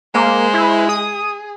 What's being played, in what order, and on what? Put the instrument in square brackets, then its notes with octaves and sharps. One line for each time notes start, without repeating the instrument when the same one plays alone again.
[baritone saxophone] G#3 [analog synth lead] A#3 [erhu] C5
[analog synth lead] E4
[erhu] G#4 [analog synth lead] D#6